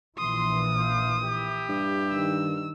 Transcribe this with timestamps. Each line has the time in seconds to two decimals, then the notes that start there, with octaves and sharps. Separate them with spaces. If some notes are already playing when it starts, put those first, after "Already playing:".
0.19 A#1 A#2 E3 C6 D#6
0.73 C5 F5
1.23 E4 G4
1.69 G2
2.11 D#3 E6